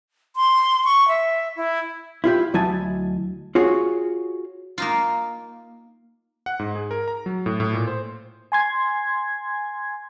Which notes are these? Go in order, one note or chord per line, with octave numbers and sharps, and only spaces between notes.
C6
C#6
E5
E4
E4 F4 G4
D2 F#3 E4 D#5 G#5 A5
F4 F#4 G#4 C#5
A#3 D#4 F4
F#5
G#2
G#4
A#4
A#5
F#3
A2
A2
A#2
C5
G#5 C6 G#6